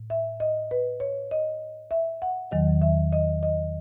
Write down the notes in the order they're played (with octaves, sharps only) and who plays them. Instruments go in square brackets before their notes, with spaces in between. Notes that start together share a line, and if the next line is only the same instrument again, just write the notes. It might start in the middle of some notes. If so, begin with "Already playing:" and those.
Already playing: [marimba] A2
E5
D#5
B4
C#5
D#5
E5
F#5
E2 D#3 F#3 D#5
E5
D#5
D#5